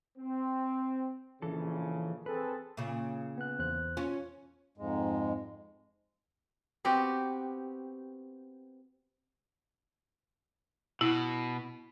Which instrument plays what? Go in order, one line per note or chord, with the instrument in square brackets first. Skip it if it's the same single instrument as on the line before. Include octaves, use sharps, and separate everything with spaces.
[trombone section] C4
[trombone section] A#1 C#3 [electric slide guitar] E3 A4
[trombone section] C4 G#4 A4 [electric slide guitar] B4
[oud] A#2 C#3
[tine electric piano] B3 F#6
E2 C5 F#6
[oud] C#4 [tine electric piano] F4
[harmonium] F2 G#2 G#3
[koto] B3 C4 F#4 G4
[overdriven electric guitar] B2 [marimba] E4